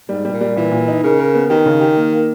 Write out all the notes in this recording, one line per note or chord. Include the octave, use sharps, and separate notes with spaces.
G#2 G3
B2 G3
A#2
G3
A#2 E3
A#2
D#4
C#3 A#4
A#4
B3
D#3 G4
C#3
G4
A#3
A#3